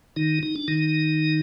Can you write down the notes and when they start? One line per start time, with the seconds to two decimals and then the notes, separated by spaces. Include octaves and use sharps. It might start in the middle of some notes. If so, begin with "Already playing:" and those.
0.16 D#3 D#4
0.43 D#4
0.56 D4
0.68 D#3 D#4